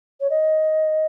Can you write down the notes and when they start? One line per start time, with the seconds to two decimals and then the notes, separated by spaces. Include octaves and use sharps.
0.21 C#5
0.30 D#5